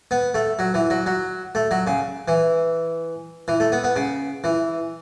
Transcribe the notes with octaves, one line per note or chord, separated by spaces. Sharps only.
B3
A3
F#3
E3
F#3
F#3
A3
F#3
C#3
E3
E3
A3
B3
B3
C#3
E3